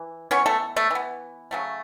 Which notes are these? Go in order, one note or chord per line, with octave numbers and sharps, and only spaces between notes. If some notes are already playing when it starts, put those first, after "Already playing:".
Already playing: E3
E3 B3 C#4 C#5
A3 A4
A3 A4
E3 B3
C#3 F#3 A3